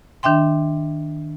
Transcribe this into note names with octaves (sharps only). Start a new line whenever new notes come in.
D#3 D4 E5 G5 C6